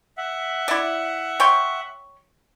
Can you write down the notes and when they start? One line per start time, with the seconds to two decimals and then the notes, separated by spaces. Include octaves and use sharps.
0.17 E5 F#5
0.68 E4 D5
1.40 C#5 G5 C6